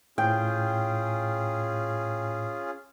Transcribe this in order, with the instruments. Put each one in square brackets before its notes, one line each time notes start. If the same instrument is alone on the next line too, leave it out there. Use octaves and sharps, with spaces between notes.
[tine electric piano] A2 [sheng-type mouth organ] C#4 F4 G#4 [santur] G5